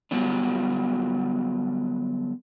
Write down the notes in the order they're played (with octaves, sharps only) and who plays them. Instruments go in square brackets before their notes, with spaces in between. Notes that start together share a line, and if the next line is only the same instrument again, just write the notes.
[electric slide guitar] D3 F#3 G3 B3 D4